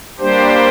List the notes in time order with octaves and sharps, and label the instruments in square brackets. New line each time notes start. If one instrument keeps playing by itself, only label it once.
[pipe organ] G3 A#3 D4 G4 C5